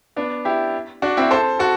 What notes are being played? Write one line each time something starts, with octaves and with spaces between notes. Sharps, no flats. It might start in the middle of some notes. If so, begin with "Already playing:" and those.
B3 D4
E4 G4
D4 F#4
C4 E4
A4 C5
F#4 A4